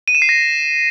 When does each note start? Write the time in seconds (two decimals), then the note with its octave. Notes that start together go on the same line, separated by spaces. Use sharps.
0.08 D#7
0.15 E7
0.22 C7
0.29 A#6